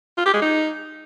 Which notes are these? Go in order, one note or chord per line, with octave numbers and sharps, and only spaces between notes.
F4
G4
G#3
D#4